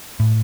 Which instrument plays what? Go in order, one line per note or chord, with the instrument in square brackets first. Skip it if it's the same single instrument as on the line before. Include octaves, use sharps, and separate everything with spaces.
[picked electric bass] A2